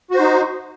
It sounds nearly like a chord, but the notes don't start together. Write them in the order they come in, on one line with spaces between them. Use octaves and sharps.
F#4 C5 D#4